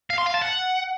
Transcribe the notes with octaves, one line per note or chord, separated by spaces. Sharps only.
F5
C6
F5
A5
F#5